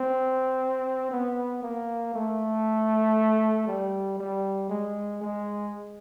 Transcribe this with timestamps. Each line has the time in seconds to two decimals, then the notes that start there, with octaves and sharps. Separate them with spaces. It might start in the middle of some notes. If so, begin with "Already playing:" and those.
Already playing: C4
1.11 B3
1.63 A#3
2.14 A3
3.67 G3
4.18 G3
4.70 G#3
5.22 G#3